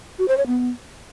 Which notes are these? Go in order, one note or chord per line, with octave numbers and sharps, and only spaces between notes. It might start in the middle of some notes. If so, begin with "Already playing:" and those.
F#4
C5
C#5
B3